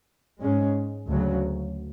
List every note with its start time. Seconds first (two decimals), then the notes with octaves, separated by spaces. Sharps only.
0.41 G#2 G#3 C#4
1.09 D2 C#3 F#3